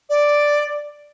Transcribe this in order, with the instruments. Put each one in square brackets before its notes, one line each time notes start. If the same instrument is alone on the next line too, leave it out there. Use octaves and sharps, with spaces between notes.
[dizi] D5